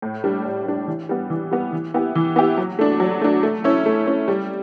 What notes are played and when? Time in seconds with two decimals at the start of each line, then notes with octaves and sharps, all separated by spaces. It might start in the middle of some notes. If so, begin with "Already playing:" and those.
0.02 A2
0.24 G3 D4
0.45 A2
0.66 G3 D4
0.87 E3
1.09 G3 B3
1.30 E3
1.51 G3 B3
1.73 E3
1.94 B3 E4 G4
2.15 E3
2.36 B3 E4 G4
2.57 F#3
2.79 A3 D4
3.00 F#3
3.22 A3 D4
3.43 A3
3.64 C#4 E4
3.86 A3
4.06 C#4 E4
4.28 G3